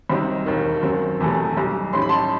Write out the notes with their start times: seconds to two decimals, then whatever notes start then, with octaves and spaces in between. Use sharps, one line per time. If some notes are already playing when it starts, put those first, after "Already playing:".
0.10 C2 C3 F#3 C4 D#4
0.46 E1 D#2 D#3
0.83 F#2 D#3 F#3 C4
1.20 E1 E2 C3 E3 A3
1.57 B1 B2 G3
1.93 A1 A2 G3 D#4 C6
2.02 B5
2.09 A5 C6